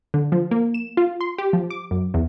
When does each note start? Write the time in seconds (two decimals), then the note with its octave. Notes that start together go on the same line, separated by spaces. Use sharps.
0.14 D3
0.32 F3
0.51 A#3
0.74 E7
0.97 F4
1.21 C6
1.38 G4
1.53 F3
1.70 D6
1.91 F#2
2.14 E2